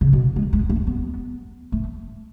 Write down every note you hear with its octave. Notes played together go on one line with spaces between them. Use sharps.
C#3
B2
G#3
G#3
A3
B3
A3